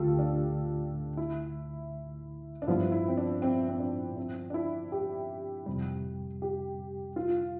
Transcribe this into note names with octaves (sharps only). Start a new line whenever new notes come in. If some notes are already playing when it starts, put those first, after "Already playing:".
Already playing: D2 D3 A3 F4 G4 A4
D4
E4
D4
G2 F3 B3 E4 F4
E4
C4
D4
C4
C4
D4
C4
D4
E4
G4
F2 C3 G3
G4
F4